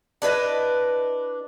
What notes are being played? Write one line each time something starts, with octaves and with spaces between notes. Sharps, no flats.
D4 E4 B4 D#5